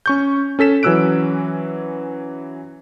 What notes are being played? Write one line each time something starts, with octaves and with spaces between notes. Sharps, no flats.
C#4 C#6 G6
C#4 A4 B6 E7
E3 F#3 C#4 E6 F#6 D7